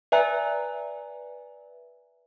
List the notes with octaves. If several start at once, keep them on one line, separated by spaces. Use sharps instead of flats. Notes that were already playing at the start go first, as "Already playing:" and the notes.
B4 D5 E5 G#5 A#5 F#6